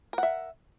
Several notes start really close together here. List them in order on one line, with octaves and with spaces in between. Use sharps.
A#4 F#5 E5